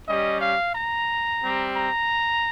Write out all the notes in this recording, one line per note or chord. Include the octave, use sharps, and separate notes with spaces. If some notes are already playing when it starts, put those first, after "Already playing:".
G3 C#4 G4 D#5
F5
A#5
G3 C4 G4
A#5